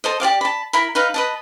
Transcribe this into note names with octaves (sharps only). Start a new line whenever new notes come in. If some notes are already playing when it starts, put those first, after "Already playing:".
A4 C5 D#5
G4 D5 F5 D6
A5 B5
E4 A#4 B5
D#4 B4 F5
B4 D#5 A5